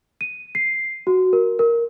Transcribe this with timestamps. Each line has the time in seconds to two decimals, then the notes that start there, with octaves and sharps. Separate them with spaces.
0.21 D#7
0.55 C7
1.07 F#4
1.33 A#4
1.59 A#4